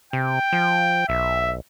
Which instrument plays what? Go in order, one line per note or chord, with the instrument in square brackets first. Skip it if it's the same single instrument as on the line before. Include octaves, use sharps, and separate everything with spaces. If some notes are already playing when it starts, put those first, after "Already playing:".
[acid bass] C3 [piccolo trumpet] G5
[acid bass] F3
[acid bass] B1 [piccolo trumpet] E5